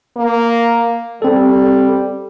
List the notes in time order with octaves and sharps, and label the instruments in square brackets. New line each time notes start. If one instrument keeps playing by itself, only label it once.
[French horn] A#3
[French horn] G3 [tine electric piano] C4 A4